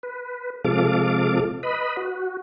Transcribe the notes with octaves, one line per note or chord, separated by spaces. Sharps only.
B4
C3 F3 G#3 A4 F5 D6
B4 D#5 B5
F#4